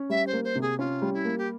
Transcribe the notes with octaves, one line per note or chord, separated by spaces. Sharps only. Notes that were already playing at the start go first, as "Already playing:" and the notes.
Already playing: C#4
G3 E5
C5
A#3
C5
C3
G#4
C#4 F4
G3
E4
A#3
G4